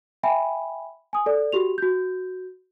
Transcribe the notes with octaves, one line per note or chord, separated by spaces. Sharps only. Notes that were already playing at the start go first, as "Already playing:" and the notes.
E5 G5 G#5 B5
G#5 D#6
A4 D5
F#4 G4 F7
F#4 G6